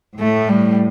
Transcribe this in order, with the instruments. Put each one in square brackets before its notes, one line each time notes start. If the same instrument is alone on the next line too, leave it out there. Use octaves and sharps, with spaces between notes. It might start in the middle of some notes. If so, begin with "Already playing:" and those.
[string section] A2 [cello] A3
[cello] G3